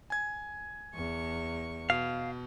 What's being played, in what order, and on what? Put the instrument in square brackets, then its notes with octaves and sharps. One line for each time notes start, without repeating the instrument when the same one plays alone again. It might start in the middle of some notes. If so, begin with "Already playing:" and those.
[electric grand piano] G#5 G#6
[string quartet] E2 C#6
[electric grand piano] B2 [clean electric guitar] F5